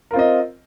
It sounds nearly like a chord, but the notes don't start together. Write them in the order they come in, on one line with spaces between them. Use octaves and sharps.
A#4 F4 C4 D#5